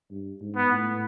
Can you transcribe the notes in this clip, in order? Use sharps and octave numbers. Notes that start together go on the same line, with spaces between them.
G2
G#2
B3
A2